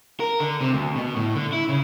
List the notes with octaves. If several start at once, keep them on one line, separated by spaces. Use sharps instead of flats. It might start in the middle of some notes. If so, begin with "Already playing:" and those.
A#4
D3
C3
D2
B2
A2
D3
E4
C#3